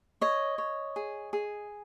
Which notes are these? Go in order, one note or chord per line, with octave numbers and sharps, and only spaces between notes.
C#5 D#5
C#5
G#4
G#4